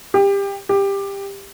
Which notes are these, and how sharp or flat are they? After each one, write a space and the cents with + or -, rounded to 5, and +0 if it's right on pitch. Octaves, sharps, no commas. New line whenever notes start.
G4 +25
G4 +15